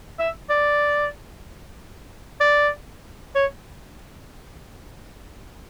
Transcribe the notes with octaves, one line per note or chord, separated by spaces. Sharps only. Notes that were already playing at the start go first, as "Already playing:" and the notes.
E5
D5
D5
C#5